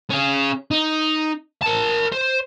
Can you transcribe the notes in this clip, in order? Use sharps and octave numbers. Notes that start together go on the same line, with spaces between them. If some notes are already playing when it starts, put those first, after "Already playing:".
C#4 G#4
D#4
A#4 A5
C5